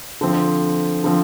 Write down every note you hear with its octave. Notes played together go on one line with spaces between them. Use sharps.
D3 F3 C4
D3 F3 C4